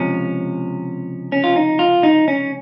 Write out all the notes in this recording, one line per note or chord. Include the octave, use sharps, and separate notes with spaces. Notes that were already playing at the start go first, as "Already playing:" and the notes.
Already playing: C#2 C3 F3 C#4
C#4
F4
D#4
F4
D#4
C#4